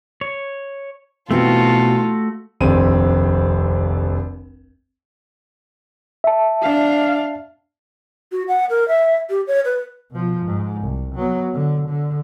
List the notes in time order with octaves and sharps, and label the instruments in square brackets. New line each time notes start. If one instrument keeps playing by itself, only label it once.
[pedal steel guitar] C#5
[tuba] B2 [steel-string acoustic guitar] E3 C4 [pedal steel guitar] A3 F#4 [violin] F4 A4
[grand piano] F1 A#1 D#2 C4 D#7
[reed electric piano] E5 A5
[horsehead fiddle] D4 F5
[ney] F#4
F#5
A#4
E5
G4
C#5
B4
[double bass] B2 F3
G#2
C2
F#3 B3
D3
D3